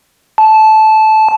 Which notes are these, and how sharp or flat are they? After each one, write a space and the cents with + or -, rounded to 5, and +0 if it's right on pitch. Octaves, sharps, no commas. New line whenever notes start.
A5 -15